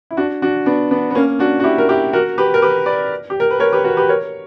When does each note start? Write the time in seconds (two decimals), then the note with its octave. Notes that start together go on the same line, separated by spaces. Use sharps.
0.11 E4
0.17 D4 F#4
0.42 D4 F#4
0.66 B3 D4
0.91 B3 D4
1.10 B3
1.15 A#3 C#4
1.39 D4 F#4
1.60 F#4
1.64 E4 G4
1.78 A#4
1.89 E4 G4
2.13 F#4 A#4
2.38 G4 B4
2.54 A#4
2.62 G4 B4
2.86 B4 D5
3.30 G4
3.40 A#4
3.51 B4
3.60 A#4 C#5
3.73 G4 B4
3.84 F#4 A#4
3.97 G4 B4
4.09 A#4 C#5